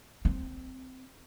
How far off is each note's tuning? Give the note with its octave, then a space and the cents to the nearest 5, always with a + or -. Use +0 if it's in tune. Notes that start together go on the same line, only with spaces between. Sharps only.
C4 -15